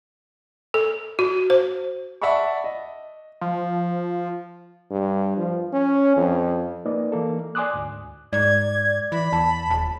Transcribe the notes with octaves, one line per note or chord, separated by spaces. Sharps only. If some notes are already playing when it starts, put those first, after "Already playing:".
A4
F#4
C5
D5 E5 F#5 A5 B5 C#6
D#5
F3
G2
F3
C#4
F2
A#3 D#4 B4 D5 D#5
E3 A#3 A4
D5 G#5 C6 D6 D#6 F#6
D2 G#2
G#2 D5 G#6
E3 B5
E2 A5
D#1 A5